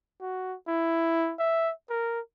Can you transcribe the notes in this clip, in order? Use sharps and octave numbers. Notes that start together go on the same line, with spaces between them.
F#4
E4
E5
A#4